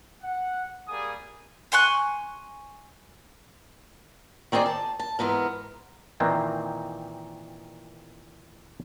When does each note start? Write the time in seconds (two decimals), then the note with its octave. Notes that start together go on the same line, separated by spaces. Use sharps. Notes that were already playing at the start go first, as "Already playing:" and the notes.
0.21 F#5
0.88 G3 A#3 G#4 G#5 D#6
1.72 G#5 C6 C#6 F#6
4.52 D#3 C4 D#4 G#4 D5
4.66 A5
4.99 A5
5.19 G#2 E3 B3 A#4
6.20 A#2 D#3 E3 A#3 C4